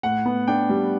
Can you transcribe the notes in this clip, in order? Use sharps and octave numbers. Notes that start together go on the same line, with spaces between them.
A2 F#5
B3
D4 G5
G3